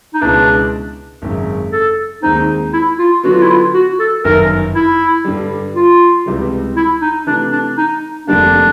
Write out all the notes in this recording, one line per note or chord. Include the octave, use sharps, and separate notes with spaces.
D#4
C#2 B2 G#3 C#4 D4 E4
G#1 F#2 C#3
A4
D#2 D#3 G#3 C4 D#4
E4
F4
D3 F#3 B3 F#4
F4
E4
F4
F#4
A4
G1 F#2 D#3 A#4
E4
G2 D3 G3
F4
C#2 C3 E3 G3
E4
D#4
C3 E3 A3 D4
D4
D#4
F1 F2 D3 G3 A#3 D4